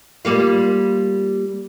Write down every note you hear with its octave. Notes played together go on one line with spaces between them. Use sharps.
G3 A#3 F4